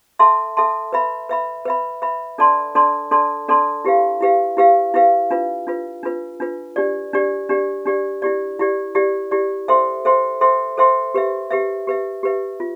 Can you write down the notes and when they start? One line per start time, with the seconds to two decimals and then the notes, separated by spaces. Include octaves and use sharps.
0.19 A4 E5 A5 C6
0.57 A4 E5 A5 C6
0.93 B4 E5 B5
1.29 B4 E5 B5
1.65 B4 E5 B5
2.02 B4 E5 B5
2.38 D4 A4 D5 A5 C6
2.75 D4 A4 D5 A5 C6
3.11 D4 A4 D5 A5 C6
3.49 D4 A4 D5 A5 C6
3.84 E4 G4 B4 F5
4.21 E4 G4 B4 F5
4.57 E4 G4 B4 F5
4.94 E4 G4 B4 F5
5.31 D4 F4 B4
5.67 D4 F4 B4
6.03 D4 F4 B4
6.40 D4 F4 B4
6.76 D4 G4 D5
7.13 D4 G4 D5
7.49 D4 G4 D5
7.86 D4 G4 D5
8.22 E4 G4 D5
8.59 E4 G4 D5
8.95 E4 G4 D5
9.31 E4 G4 D5
9.68 A4 C5 E5 G5 C6
10.05 A4 C5 E5 G5 C6
10.41 A4 C5 E5 G5 C6
10.77 A4 C5 E5 G5 C6
11.14 G4 B4 E5
11.51 G4 B4 E5
11.87 G4 B4 E5
12.23 G4 B4 E5
12.60 F4